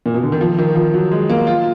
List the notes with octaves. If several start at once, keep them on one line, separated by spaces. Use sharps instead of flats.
A#2
B2
D3
D#3
F3
D#3
F3
F#3
G#3
A#3
F4